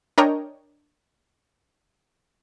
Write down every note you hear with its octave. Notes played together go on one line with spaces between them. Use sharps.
D4 A#4 C#5 D#5 G5 A#5